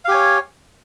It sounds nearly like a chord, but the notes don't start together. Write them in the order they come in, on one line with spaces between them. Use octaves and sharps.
F5 G4 G#5 C#5